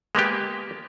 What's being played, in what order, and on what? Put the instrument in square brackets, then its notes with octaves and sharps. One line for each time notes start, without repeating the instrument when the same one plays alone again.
[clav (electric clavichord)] G#3 A#3 B3 G4